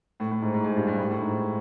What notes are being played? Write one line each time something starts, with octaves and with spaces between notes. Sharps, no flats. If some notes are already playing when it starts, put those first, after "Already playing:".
A2
A2
G#2
G#2
G#2
G2
G2
A2
A2
G#2